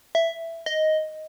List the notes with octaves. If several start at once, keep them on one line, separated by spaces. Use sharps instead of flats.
E5
D#5